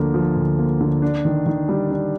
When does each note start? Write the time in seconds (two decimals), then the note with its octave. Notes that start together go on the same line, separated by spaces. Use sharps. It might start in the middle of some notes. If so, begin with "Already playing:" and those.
Already playing: D2 D3 F3 A#3
0.14 F3
0.36 D2
0.59 A#3
0.81 D3
1.02 D4
1.25 D#3
1.46 D#3
1.69 G3
1.91 D4